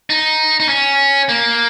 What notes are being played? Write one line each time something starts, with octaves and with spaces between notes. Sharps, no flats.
D#4
D#4
C#4
A#3